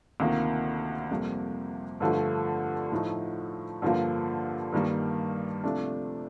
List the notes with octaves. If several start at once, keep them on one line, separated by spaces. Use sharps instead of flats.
D2 C3 D#3 A#3 F4
F2 C3 G3 A#3
G2 D3 F3 A3
A2 F3 A3 D#4
G2 D3 F3 A#3 F4
G2 D#3 G3 A#3
C3 F3 A3 D4